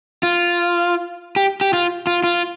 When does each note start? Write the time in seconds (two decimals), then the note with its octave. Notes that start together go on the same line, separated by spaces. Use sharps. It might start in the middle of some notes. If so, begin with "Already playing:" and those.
0.23 F4
1.36 G4
1.61 G4
1.73 F4
2.07 F4
2.24 F4